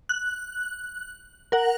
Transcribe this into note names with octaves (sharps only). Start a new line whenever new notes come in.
F#6
A#4 F#5